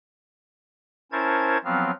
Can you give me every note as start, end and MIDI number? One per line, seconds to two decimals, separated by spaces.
1.12 1.57 61
1.12 1.57 64
1.12 1.57 70
1.12 1.57 72
1.12 1.57 81
1.12 1.57 92
1.64 1.91 53
1.64 1.91 54
1.64 1.91 59
1.64 1.91 60
1.64 1.91 77